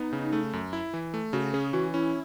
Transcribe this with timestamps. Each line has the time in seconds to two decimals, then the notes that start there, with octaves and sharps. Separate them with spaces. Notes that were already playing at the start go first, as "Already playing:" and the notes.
Already playing: B3 D#4
0.13 C#3
0.33 A3
0.53 F#2
0.73 E4
0.94 E3
1.14 A3
1.33 C#3 F#4
1.54 C#4 G#4
1.73 E3 F#4
1.94 C#4 E4